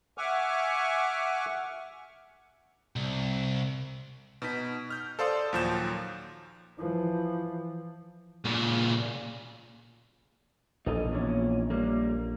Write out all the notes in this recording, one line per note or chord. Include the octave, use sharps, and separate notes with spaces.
E5 F#5 G#5 C#6 D6 F6
C2
B2 D#4 B6
F6 G6
A4 C5 D5 F5 C6 D#6
D#2 A#2 F3 F#3 G6 E7
E3 F3
A#2 C#3
A#1 D#4 A4 D#5
E2 A#2 C#4
G3 A#3